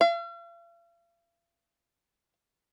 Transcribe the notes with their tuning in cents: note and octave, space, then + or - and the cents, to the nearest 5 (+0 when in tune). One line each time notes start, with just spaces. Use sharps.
F5 -45